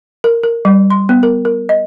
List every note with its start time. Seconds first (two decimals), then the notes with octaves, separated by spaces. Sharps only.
0.24 A#4
0.43 A#4
0.65 G3
0.90 C6
1.09 B3
1.23 A#4
1.45 A#4
1.69 D#5